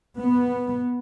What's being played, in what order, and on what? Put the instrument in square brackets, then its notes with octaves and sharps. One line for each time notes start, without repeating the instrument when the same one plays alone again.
[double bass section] B3